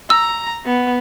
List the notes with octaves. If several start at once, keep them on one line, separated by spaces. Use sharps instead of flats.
A#5 E6
B3